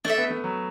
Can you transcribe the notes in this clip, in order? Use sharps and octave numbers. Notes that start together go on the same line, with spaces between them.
A3 D4 A4 E5
B3
A3
F#3